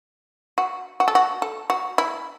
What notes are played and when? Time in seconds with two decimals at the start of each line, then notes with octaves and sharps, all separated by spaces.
0.58 F#4
1.00 F#4
1.08 A4
1.15 F#4
1.42 A4
1.70 F#4
1.98 E4